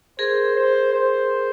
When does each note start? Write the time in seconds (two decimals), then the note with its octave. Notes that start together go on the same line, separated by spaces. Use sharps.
0.18 G#4 A#4 C5
0.56 C5
0.93 C5